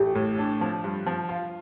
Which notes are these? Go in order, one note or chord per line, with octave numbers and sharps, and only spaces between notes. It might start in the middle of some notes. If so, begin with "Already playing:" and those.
Already playing: A1 A3 G4
A2
D4
F3
G2
F3
F4